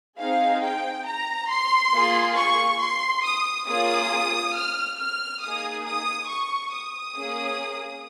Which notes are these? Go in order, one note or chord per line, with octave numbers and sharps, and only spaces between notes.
C4 D#4 G#4 F5
G5
A#5
C6
A#3 F4 G#4
C#6
C6
D#6
A#3 C#4 F4 G#4 D#6
F6
F6
A#3 D#4 G#4 D#6
D#6
C#6
D#6
A#3 C#4 G#4